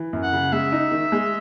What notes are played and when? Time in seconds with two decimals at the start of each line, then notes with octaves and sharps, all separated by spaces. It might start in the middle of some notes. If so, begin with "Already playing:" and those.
Already playing: E3
0.13 F#2
0.23 F#5
0.33 C#3
0.52 G#3 E5
0.72 D#4
0.92 D#3
1.12 G#3